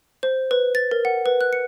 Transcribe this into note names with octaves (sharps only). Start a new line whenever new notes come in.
C5
B4
A6
A#4
F#5
B4
F#6
C#7